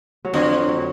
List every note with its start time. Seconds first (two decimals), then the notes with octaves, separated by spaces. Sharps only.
0.25 F#3
0.33 F2 D3 F3
0.69 F#3